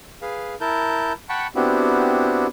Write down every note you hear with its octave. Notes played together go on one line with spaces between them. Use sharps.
G#4 B4 F5
E4 A#4 A5 G6
F#5 G5 A5 B5 C#6
B3 C4 D4 E4 F#4 G4